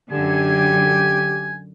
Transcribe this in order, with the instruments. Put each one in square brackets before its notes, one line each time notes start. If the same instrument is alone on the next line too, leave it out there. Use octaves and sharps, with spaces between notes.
[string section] F#2 D3 [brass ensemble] G4 [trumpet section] G#5